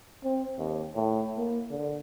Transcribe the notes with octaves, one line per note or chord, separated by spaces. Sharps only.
C4
D#2
A2
A#3
D3